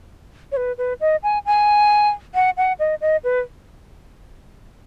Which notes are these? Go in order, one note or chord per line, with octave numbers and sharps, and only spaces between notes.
C#5
B4
B4
D#5
G#5
G#5
F#5
F#5
D#5
D#5
B4